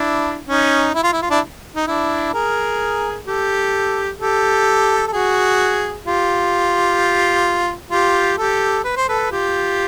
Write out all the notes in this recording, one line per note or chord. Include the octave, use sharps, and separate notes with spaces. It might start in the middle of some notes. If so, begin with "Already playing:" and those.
Already playing: D4 E4
C#4 D#4
E4
F4
E4
F4
D4 E4
D#4
D4 E4
G#4 A#4
G4 A4
G4 A4
A4
F#4 G#4
F4 G4
F4 G4
G4 A4
B4
C5
A4 B4
F4 G4